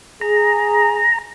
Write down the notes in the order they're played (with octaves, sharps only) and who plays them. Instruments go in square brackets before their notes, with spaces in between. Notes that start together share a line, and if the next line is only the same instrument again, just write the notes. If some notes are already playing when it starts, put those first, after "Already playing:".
[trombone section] G#4 [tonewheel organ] A#5